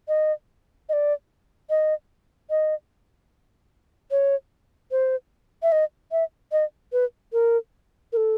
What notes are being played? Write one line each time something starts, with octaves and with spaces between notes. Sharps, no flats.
D#5
D#5
D5
D#5
D#5
C#5
C5
E5
D#5
E5
D#5
B4
A#4
A#4
A4